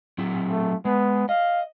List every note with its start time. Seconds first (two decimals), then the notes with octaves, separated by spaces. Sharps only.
0.18 F#3 C4 E4
0.51 A3
0.85 G#3 B3
1.29 D#5 F5